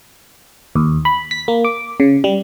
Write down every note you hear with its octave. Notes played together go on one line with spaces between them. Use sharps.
D#2
B5
B6
A#3
D6
C#3
G3